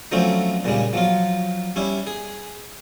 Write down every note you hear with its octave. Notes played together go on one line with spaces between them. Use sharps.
D3 F3 F#3 A3 C4 C#4
A#2 C#3 G3 G#3
F3 F#3 F4
G3 C#4 E4
G#4